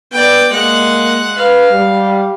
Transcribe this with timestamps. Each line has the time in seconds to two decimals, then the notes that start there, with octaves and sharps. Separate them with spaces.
0.12 B3 D5 G5
0.53 G#3 A#3 F#5
1.38 B4 F5
1.71 G3